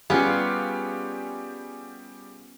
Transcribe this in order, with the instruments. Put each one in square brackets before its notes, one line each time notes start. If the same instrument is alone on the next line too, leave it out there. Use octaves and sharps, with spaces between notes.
[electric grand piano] G3 G4 G#4 [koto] B3 C#4 [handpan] F4 F5